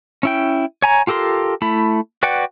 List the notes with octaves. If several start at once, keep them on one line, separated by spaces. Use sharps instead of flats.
C#4 E4 G5
C#5 G#5 A#5
F4 G4 A4 A#4 C6
A3 E4 B5
F#4 B4 D5 F#5 G5